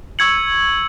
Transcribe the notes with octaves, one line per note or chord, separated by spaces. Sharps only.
C#6 E6 G#6 C#7 F#7